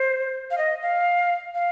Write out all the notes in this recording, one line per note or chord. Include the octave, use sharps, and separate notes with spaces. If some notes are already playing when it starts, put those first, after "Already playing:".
Already playing: C5
F5
D#5
F5
F5